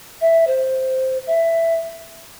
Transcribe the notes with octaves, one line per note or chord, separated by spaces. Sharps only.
E5
C5
E5